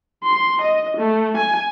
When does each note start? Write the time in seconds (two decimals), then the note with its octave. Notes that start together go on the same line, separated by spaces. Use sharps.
0.24 C6
0.62 D#5
0.97 A3
1.37 G#5